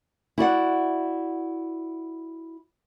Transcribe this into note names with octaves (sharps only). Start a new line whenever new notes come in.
E4 F#4 D5 F#5